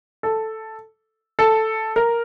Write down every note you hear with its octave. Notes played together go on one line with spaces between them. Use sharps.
A4
A4
A#4